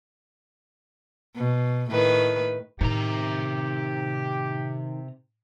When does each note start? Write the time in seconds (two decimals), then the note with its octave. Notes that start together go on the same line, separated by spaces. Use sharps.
1.36 B2
1.90 A2 D#3 B4
2.81 A2 C3 D#3 G4 A#5